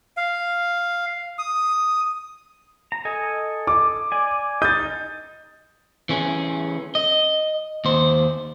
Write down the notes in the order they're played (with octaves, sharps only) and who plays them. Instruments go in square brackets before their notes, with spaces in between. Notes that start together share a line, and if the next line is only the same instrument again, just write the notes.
[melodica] F5
D#6
[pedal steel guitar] A#5
A4 D#5 G#5
[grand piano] D6
[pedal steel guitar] D5 G#5
[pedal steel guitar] D#4 D#5 [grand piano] G6 A6
[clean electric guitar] E3 C#4 G#4
D#5
D#2 C5